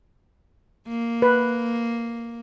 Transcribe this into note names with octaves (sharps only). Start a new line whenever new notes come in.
A#3
B4